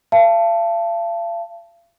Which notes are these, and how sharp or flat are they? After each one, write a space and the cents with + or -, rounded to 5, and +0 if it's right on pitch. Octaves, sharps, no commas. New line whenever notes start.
F5 -45 A5 +0